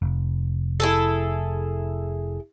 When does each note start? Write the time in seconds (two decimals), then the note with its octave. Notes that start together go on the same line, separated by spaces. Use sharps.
0.02 F1
0.80 E4 G#4 A4